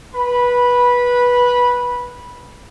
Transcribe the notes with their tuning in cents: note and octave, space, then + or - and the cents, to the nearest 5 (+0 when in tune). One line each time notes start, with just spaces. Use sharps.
B4 -15 B5 -10